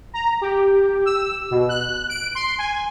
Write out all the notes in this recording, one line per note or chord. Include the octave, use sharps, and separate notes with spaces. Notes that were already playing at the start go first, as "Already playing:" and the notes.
A#5
G4
E6
B2
F#6
D7
C6
G#5